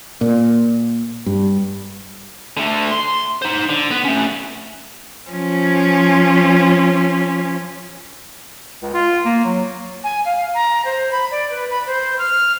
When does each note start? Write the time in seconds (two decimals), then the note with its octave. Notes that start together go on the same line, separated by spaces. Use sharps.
0.21 A#2
1.26 G2
2.57 D3 A3
2.92 C6
3.42 D#4 C5
3.69 D3
3.91 B3
4.05 A3 C#4
5.31 F3 C#4
8.82 C#2
8.94 F4
9.25 A#3
9.45 F#3
10.04 G#5
10.25 F5
10.54 A#5
10.85 C5
11.12 B5
11.31 D5
11.51 B4
11.71 B5
11.87 C5
12.19 F6